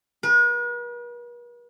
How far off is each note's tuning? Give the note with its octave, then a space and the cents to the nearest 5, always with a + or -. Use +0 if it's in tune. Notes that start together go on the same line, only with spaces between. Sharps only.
B4 -45